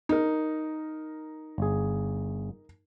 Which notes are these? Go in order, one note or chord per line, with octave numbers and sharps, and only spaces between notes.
D#4 A#4
G1 G#4